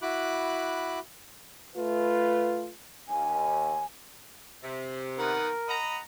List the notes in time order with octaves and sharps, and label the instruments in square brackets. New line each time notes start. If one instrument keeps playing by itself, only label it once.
[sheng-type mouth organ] E4 F#4 B5 D6 F#6
[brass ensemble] A3 F4 B4
[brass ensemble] D#2 [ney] G#5
[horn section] C3
[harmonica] D#3 B3 F#5 [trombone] A#4
[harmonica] D#5 B5 [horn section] F#5 A#5